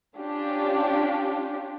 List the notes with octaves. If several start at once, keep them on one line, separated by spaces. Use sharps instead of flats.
C#4 D4 F4 G4